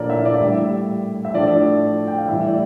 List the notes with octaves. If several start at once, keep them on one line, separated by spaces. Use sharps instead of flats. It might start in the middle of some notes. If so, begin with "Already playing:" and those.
Already playing: A#2 F3 D4 A4 A#4 C#5 D5
E4 E5
D4 D5
F5
A2 G3 E4 E5
E5
A2 F3 D4 D5
G5
F5
A2 E3 G3 E4 E5
D5